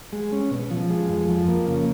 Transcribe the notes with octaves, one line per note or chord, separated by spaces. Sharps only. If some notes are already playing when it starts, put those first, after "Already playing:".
G#3
C#4
B2
F3
G#3
F2
F3
A#3
C#3